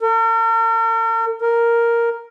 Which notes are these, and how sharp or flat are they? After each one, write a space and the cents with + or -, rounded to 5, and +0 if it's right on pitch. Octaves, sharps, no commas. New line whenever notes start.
A#4 -45
A#4 +0